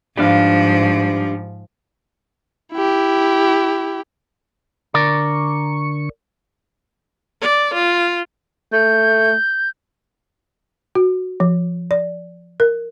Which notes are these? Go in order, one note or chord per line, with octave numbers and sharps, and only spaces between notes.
G#2 F3 G3 D4 F5
E4 G4
D3 A#4 D5 C#6
D5
F4
A3 G6
F#4
F3
D5
A#4